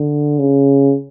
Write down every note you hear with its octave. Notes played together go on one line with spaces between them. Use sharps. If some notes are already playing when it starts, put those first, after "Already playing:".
Already playing: D3
C#3